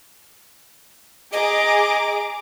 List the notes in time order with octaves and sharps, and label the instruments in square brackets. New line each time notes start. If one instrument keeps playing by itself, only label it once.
[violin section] G#4 A#5 D6 [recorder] D#5